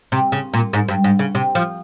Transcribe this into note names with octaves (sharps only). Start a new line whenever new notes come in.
C3
C#3
A#2
G#2
G2
G#2
C#3
C3
F3